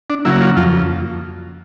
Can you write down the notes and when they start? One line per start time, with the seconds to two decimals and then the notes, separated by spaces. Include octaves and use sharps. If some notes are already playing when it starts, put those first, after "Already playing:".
0.10 D4
0.25 C#3 F#3 A#3 E4
0.41 F4
0.57 F2 F4